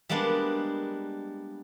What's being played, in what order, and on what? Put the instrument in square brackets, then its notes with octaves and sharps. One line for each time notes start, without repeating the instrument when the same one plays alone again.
[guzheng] G3 G#3 A#3 B3 D4